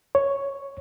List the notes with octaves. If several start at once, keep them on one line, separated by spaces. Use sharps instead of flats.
C#5